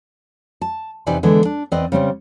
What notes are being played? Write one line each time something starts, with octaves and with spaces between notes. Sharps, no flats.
A5
E2 C3 D#4 B4 D5 G#5
D3 E3 G#3 B3
D4
E2 C4 B4 D5 D#5
C#3 G3 C4 C#4